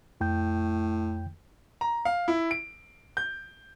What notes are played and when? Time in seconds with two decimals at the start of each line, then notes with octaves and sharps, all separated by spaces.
0.21 F2 A2 G5 G6
1.81 A#5
2.05 F5
2.28 E4
2.51 D7
3.17 G6